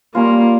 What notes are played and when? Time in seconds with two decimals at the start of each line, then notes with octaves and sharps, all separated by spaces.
0.15 G3 A#3 C#4 F4